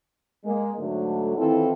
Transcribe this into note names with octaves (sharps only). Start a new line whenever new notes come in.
G#3 A#3
G#2 D3 F#3 A3
D#3 E3 C4 E4 F4 A4